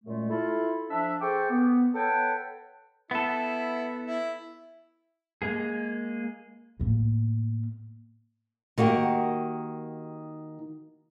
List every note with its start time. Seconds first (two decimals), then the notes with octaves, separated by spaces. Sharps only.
0.04 F#2 A#2 G#3 A3
0.30 E4 F4 A4
0.90 F3 D4 E5
1.21 G#4 A4 C5 G5 C#6 D6
1.50 B3
1.94 A4 B4 C#5 F#5 G5 A5
3.11 B3 E4 A4
4.06 E4
5.42 G#3 A#3 G#4
6.80 A2 A#3
8.78 D#3 A#3 F#4 G4